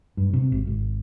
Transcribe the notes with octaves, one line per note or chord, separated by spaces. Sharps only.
G2
C3
G#1
G#1